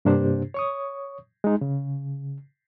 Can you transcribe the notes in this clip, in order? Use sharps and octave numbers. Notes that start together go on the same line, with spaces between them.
G2 C3 A#3 D4 G4 C5
C#5 C#6 D#6
G#3 D#4
C#3